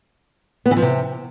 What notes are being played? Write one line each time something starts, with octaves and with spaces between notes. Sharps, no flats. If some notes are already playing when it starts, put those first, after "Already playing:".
B3
E3
F3
C3